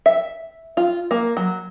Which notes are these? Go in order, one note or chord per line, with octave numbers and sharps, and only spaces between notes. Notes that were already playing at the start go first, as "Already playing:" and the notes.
E5
F4
A#3
F#3